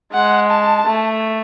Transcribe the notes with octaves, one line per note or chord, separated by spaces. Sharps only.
G#3 F#5
A5
A3